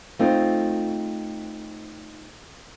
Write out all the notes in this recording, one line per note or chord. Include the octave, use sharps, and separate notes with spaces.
A3 C4 D#4 F4